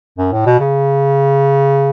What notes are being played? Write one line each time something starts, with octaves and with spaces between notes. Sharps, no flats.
F#2
A2
B2
C#3